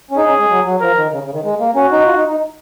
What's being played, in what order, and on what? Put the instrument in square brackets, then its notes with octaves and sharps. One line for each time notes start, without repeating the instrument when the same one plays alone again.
[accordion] C#4
[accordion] D#4 [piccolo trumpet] G#4
[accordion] C#4
G#3
F#3
F#3
[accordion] F3 [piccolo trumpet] A#4
[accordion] D#3
C#3
C#3
D#3
G#3
A#3
[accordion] C#4 [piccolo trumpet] F#4
[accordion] D#4
F4
D#4
D#4